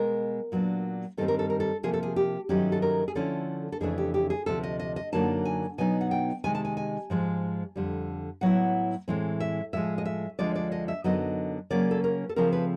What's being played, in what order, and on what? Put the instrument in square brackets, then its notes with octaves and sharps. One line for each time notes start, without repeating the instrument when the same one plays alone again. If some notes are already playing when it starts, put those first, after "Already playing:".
Already playing: [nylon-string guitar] B2 G#3 B3 A#4
A#2 F#3 B3 D4
G2 D#3 G3 C4 A4
A#4
A4
A#4
A4
C3 F3 A#3 G#4
A4
G#4
G4
G2 D#3 F#3 A3 C#4 G4
A4
A#4
G#4
D3 F3 A3 C#4 E4 A4
A4
F2 C#3 E3 A3 D4 G#4
G4
G4
G#4
D2 C3 F3 A4
D#5
D#5
D#5
F#2 D3 F#3 A#3 D#4 A5
G#5
B2 F#3 B3 D#4 G#5
F#5
G5
C3 D#3 G#3 G#5
A5
G#5
G#5
G#2 F3 G#3
F2 D3 G3
A2 F#3 B3 E4 F#5
A2 E3 G#3 C4
E5
A2 F3 G#3 E5
D#5
E5
D2 D3 F3 G#3 D5
D5
D#5
E5
F#2 D3 F#3 B3 D#4 D#5
C#3 F#3 A#3 C#4 D5
A4
A#4
A4
C#3 F3 A3 C4 A#4
B4